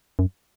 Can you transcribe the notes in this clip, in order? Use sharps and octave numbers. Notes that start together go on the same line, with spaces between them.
F#2